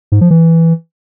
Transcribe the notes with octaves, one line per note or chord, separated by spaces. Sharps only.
G#2
F3
E3